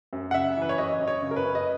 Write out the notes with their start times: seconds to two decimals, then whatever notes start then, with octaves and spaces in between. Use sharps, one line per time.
0.13 F#2
0.31 F#5
0.34 C#3 E5
0.57 E3 B4
0.69 C#5
0.78 F#2 D#5
1.00 F#2
1.08 C#5
1.22 C#3
1.31 A#4
1.36 B4
1.44 F#2
1.55 D#5